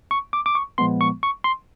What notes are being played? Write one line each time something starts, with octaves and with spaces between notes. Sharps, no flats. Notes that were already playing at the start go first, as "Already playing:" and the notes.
C#6
D6
D6
C#6
A#2 F3 G#3 B3 C6
C#6
C#6
C6